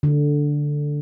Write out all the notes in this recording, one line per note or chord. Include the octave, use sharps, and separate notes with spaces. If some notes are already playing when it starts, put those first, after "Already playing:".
D3